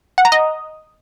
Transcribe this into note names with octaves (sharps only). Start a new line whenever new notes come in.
F#5
A#5
D#5